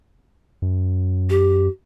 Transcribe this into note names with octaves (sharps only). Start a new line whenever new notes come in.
F#2
G4